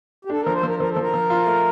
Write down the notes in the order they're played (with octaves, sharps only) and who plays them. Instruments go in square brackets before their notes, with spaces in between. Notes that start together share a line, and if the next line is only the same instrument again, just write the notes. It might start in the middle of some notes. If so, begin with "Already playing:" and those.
[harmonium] G4
[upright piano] D4 [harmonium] A4
[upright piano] F3 [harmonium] A#4
[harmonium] C5
[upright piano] F3 [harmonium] A#4
[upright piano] F3 [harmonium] A#4
[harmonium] A4
[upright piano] F3 [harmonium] A#4
[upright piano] F3
F4
A3